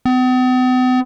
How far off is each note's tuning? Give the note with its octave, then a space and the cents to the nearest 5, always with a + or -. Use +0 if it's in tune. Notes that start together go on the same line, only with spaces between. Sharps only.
B3 +45